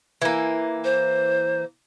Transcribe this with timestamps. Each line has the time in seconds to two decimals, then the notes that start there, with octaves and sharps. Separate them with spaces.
0.22 E3 A#3
0.84 C5